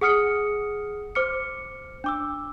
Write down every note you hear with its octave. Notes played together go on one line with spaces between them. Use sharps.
G#4 F#5 D#6 F6 C#7
C5 D6 F6 C#7
D4 D6 E6